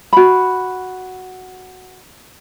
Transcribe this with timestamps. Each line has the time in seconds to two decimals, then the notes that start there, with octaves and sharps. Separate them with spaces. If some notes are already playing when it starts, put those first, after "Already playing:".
0.13 F#4 B5